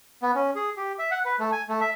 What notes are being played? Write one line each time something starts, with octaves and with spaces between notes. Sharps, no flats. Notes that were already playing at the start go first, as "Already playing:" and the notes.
B3
C#4
G#4
G4
E5
F#5
B4
A3
G#5
A3
E5